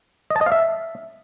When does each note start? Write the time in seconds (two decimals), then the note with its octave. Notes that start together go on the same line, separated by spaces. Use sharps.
0.30 D#5
0.36 A5
0.41 D#5
0.46 F5
0.52 E5